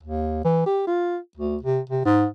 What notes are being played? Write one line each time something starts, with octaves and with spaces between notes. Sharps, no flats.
D#2
E3
G4
F4
D2
C3
C3
G#2